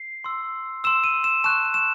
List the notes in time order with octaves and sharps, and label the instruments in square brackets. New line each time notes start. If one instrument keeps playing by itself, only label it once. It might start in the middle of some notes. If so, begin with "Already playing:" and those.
Already playing: [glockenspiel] C7
C6 E6
C6 E6 E7
D#7
E7
A5 C#6 F#6 E7
E7